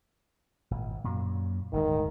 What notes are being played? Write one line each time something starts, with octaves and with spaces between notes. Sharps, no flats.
G#1 A#2
F#2 A#2 F#3
D1 G1 D2 D#3 G#3